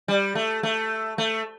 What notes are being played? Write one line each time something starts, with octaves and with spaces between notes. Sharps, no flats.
G3
A3
A3
A3